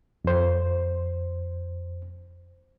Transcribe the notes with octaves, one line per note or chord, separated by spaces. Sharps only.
F2 C5